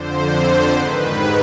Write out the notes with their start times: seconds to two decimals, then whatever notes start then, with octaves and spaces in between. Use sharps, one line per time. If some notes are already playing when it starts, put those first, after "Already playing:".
Already playing: F2 D3 C5
0.71 G#2 D#3 B4
1.13 G4